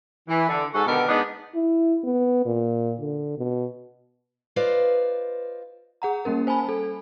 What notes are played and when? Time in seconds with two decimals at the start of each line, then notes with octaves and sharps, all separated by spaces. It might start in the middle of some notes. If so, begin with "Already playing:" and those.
0.28 E3
0.48 D3
0.73 G#2 G#3 F#4 A4
0.86 B2 D3 D#3 B3 G4 A#4
1.08 G#2 B3 D4 D#4
1.55 E4
2.04 B3
2.45 A#2
3.00 D3
3.38 B2
4.56 F4 B4 C5 D5 D#5 F5
6.02 G#4 F#5 A#5
6.25 G3 A#3 C#4 A#4
6.47 C5 G#5 A5 B5
6.69 A4